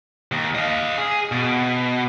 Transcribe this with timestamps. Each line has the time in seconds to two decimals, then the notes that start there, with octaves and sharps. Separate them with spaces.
0.32 D#2
0.55 D#5 F5
0.98 G#4
1.32 B2